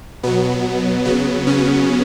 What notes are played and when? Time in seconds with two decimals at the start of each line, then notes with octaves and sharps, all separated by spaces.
0.23 B2 F#3 B3
1.05 C#3 F#3 B3
1.47 C#3 C#4